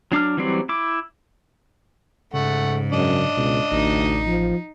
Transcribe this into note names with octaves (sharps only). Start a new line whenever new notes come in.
F#3 D4 D6 F6
E3 F#3 G3 C4 D5
E4 D6
G#2 C#3 A3 F#5
F#2 D4 D#5
C#2 B2
A1 D2 D#4
F3